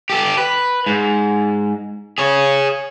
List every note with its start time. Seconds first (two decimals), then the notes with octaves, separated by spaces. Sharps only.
0.10 G4 A4
0.37 B4
0.86 G#2
2.18 G#4 C#5